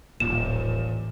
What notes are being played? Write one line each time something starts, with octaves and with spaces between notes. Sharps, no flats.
D#1 A1 A#2 F3 E7